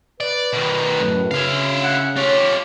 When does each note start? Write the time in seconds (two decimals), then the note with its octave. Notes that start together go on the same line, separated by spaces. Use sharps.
0.20 B4 D5
0.53 B2 D#3
0.99 F#2 A2
1.31 C#3 E4 F5
1.83 F#5
2.16 F4 G4 C#5